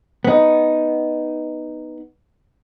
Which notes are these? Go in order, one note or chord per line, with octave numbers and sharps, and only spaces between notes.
B3 D#4